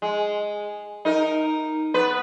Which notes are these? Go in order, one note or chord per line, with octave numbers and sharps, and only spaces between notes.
G#3
D#4 A#4
B3 B4